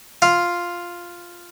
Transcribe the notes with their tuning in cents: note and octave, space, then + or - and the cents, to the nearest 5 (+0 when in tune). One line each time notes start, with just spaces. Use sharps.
F4 +0 F5 +0